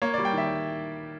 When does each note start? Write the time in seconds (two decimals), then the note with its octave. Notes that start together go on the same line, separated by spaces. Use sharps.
0.02 A#3 C#5
0.14 G3 D5
0.25 G5
0.33 D#3 E5